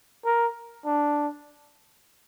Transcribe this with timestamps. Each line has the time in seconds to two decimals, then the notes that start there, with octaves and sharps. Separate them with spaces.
0.25 A#4
0.85 D4